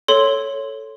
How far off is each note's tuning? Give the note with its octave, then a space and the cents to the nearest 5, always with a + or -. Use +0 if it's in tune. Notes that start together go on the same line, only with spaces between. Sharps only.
A4 +0 C#5 +0 C6 +0